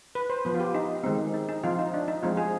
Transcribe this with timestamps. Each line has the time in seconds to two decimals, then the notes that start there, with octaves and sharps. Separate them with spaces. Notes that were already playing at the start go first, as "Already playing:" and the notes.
0.15 B4
0.30 C5
0.45 F3 B3 B4
0.54 F4
0.60 G4
0.74 D#4
1.04 D#3 G#3 C4
1.34 D#4
1.49 D#4
1.63 F3 C4 F4
1.79 D#4
1.94 D4
2.08 D#4
2.23 F3 G#3 C4 F4
2.37 G#4